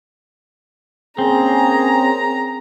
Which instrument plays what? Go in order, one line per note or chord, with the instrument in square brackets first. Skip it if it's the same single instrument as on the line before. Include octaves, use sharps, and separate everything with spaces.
[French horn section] A#3 C#4 [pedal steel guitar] C4 [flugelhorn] G#4 [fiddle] A#5